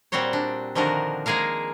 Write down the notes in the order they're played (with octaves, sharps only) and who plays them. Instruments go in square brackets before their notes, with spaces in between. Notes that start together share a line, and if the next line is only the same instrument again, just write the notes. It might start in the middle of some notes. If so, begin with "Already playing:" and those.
[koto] A#2 G3 C4 F#4 C5 C#5
D4
D3 D#3 F3 D4 F#4 A#4
G#3 A#3 G#4 A#4 F5